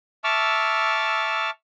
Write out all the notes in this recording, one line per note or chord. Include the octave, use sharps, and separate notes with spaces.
E5 A5 C#6 D6 E6 F6